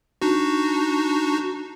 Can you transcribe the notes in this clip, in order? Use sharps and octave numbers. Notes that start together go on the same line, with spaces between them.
D4 D#4 F#4